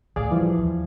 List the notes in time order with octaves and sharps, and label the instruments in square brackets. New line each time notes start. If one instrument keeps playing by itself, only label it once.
[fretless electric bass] D2 A2 [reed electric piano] G#4 D5 F5
[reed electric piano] E3 F3 [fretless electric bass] G3
[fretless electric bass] E2